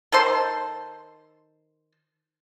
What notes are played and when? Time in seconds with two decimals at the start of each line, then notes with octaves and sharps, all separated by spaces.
0.12 D#3 A4 C5 C6